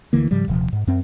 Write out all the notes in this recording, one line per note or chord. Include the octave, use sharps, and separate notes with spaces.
D2 D3 E3 A#3
G#2 C#3 F3 G3
D#1 C3 F3
G#2
F#2 C4